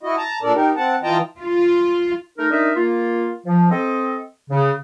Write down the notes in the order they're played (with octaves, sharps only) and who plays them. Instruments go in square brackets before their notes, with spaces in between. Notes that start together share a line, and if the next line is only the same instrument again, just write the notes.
[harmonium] E4 F#4 D#5
A5 A#5
A#2 D4 A4 A#4 D5
D#4 G4 A#4
C4 F#5 A5
E3 F4 D#5 G5 A5 A#5
[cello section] F4
[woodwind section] A3 D#4 A#4
D4 D#4 A#4 D#5 E5
A#3 F4
F3
C4 A4 D#5
C#3